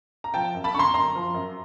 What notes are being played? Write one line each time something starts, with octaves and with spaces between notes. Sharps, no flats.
A#5
F3 G5 A5
F#2
A5 B5
D3 A#5 C6 C#6
F#2 A#5 C6
F3
F#2